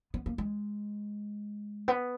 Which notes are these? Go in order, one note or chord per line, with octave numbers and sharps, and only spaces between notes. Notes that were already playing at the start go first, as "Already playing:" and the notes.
B3
A#3
G#3
B3